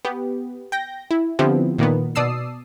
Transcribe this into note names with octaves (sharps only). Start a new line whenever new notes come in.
B3 G4
G5 G6 A#6
E4
D3 F3 B3 C4 E4 G4
A#2 D#3 A#3 B3
B2 D5 A5 D#6 E6 C7